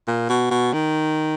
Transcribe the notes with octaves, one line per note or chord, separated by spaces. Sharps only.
A#2
B2
B2
D#3